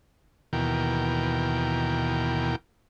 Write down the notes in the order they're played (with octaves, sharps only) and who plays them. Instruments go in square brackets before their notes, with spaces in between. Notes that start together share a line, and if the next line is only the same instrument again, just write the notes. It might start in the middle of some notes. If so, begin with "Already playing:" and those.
[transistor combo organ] D#2 B2 E3 A#4 G5